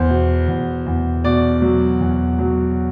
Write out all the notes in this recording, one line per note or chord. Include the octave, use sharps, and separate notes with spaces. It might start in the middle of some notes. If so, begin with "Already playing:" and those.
Already playing: E2 C5
B2
E2
E2
B2 D5
F#3
E2
F#3